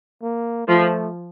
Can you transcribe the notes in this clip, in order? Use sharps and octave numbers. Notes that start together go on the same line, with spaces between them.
A#3
F3 A3